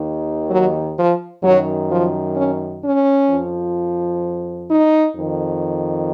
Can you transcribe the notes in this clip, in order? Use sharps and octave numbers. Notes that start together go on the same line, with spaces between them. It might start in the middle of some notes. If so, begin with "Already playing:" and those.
Already playing: D#2 D#3
F#3
F3
F#2 D#3 F#3
F3
C#4
C#4
F2 F3
D#4
F2 D#3